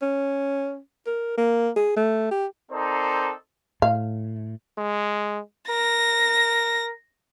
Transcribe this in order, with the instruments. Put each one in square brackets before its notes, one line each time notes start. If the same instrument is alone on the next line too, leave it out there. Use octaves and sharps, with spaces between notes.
[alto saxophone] C#4
A#4
A#3
G#4
A3
G4
[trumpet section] C4 D#4 A4 A#4 C5 D5
[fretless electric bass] A2 [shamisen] F5
[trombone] G#3
[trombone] A#4 [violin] A#6